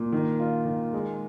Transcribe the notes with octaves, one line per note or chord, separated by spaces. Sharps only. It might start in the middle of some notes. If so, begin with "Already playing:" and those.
Already playing: A#2
D#3
F4
D#3
G#3